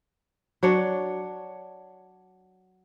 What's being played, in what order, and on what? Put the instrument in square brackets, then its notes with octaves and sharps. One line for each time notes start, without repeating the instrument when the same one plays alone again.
[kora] F#3 D4 C#5